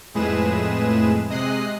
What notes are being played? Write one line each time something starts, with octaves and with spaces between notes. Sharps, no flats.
F2 A2 G#3 G#4 B4 E7
C3 G#3 D#5 D#6 F#6 C7